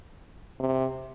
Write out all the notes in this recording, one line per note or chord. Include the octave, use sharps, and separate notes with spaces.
C3